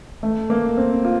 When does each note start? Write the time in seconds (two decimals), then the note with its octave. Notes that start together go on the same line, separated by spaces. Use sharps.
0.23 A3
0.50 A#3
0.77 C4
1.04 F4